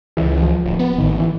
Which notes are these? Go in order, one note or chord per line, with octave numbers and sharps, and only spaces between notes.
C#2 E3
F3
D1
B3
A1 D#3
E3